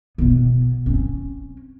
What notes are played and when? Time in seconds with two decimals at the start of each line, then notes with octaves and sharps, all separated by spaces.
0.18 B2 B3
0.86 C4 C#4